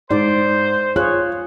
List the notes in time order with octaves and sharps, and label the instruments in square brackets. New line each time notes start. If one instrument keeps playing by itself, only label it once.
[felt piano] G#2 [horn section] C5 [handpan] D5
[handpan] F4 G#4 C#5 [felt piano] F#6